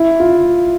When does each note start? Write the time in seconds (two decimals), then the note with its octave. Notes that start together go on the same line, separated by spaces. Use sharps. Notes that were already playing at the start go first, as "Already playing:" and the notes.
Already playing: E4
0.20 F4